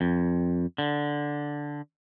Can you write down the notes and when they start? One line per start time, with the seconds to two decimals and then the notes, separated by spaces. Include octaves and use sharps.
0.01 F2
0.78 D3